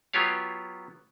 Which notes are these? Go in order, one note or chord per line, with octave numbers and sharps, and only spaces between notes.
F#3 B3 F4 G4 C#5 F5